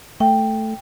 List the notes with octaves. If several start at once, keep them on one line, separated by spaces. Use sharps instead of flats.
A3 G5